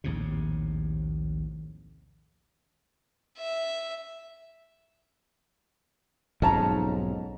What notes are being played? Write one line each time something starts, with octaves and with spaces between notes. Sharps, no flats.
A#1 D#2 A2 C3
E5
B1 F2 G#2 C#4 A5 A#5